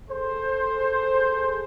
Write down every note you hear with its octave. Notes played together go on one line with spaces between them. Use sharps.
G#4 A4 C5